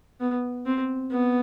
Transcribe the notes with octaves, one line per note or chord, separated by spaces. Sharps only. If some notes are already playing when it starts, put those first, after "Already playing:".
B3
C4
B3